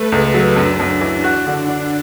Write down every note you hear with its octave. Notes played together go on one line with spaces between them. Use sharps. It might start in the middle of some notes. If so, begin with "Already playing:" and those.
Already playing: A3 A4 B4
C#2
F#3
F#2 D4
F#2
E3
F#4
D3
D4